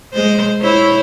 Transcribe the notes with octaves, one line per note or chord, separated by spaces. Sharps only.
G#3 C5
E4 C5 C#5